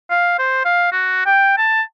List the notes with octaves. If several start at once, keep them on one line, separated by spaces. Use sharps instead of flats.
F5
C5
F5
F#4
G5
A5